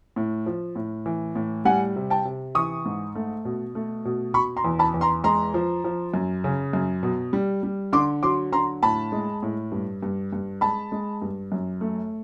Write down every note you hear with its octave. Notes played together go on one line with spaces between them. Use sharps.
A2
F3
A2
E3
A2
G3 F#5 G#5
C3
G5 A5
C3
E3 C#6 D#6
G#2
A3
B2
A3
B2
B2 B5 C#6
A#5 C6
E2
A5 B5
E2
A#5 C6
G#3 A#5 C6
F3
F3
F#2
C#3
F#2
B2
G3
G3
D3 C6 D6
F#3 C6 D6
D3 A#5 C6
A2 A5 B5
G#3
A2
G2
G2
G2
G#3 A5 B5
G#3
G2
F#2
A3